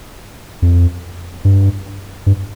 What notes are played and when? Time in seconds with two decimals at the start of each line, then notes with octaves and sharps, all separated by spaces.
0.62 F2
1.45 G2
2.26 G2